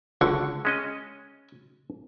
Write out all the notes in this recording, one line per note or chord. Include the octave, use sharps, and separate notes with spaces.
C#2 D3 F#5 C#6
G#3 C#4 D#5